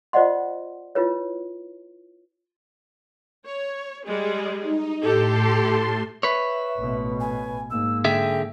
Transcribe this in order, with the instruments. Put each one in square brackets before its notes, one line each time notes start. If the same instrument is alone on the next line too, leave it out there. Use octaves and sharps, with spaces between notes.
[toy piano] F4 C5 D5 D#5 F#5 C6
E4 F4 B4 C#5
[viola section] C#5
G3 G#3 G#4
[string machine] D#4
[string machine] A2 A5 C6 [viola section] G4 A4
[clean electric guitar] B4 C#5 [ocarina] E5
[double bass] A1 B2
[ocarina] G#5
[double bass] G#2 A#3 [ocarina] E6
[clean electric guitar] D3 G#4 E5 [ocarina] G5